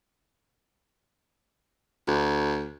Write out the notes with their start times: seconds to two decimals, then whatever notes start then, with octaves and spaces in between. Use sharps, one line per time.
2.08 D2